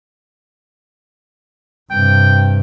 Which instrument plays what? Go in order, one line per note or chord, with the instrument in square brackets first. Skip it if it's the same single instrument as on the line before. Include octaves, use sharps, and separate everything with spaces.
[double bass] G2 C3 [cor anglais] G5